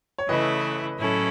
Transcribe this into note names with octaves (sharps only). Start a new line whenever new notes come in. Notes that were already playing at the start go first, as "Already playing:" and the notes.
C#5
C#3 E3 A3 E4 B4 D#5
A2 F#3 C#4 E4 A4